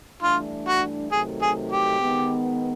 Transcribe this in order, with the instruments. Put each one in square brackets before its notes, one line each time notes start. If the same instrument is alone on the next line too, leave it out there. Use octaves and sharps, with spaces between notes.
[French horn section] G2 E3 A3 D4 [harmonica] F4
[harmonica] F#4
[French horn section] C3 D#3 F#3 A3 [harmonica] G#4
[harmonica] G#4
G4
[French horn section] D#3 G#3 B3